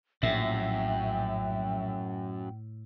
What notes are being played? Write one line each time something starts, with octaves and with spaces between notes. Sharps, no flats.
A#1 F#2 A2 E5 G5